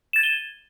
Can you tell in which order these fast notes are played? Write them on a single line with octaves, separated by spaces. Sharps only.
E7 A6 G#6 D#7 G7